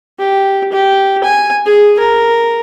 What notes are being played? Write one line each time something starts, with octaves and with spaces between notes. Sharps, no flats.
G4
G4
G#5
G#4
A#4